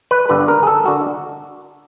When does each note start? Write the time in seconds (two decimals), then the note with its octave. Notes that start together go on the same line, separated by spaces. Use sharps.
0.11 B4
0.29 G1 G2 D3 B4
0.48 A#4
0.63 G#4
0.67 A4
0.86 D3 F#4